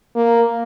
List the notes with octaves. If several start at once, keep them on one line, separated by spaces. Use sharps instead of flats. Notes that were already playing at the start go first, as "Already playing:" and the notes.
A#3